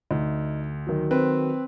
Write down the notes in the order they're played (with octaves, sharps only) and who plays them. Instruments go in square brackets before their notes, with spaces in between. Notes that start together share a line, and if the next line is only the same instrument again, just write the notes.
[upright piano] D2 [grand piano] D#4
[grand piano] D#3 F#3
[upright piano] C4 B4